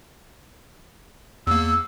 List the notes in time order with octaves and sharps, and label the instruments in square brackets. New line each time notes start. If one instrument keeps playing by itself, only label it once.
[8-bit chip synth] E2 A#3 [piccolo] E6